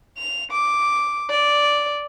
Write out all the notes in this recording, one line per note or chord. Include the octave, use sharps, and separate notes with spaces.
F7
D6
D5